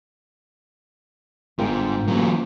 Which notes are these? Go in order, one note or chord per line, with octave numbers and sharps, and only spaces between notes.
G1 G#2 F4 A#4 G5
A1 E3 F#3 A#3 A#4